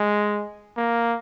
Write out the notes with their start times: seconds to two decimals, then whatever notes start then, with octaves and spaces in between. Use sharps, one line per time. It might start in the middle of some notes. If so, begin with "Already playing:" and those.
Already playing: G#3
0.77 A#3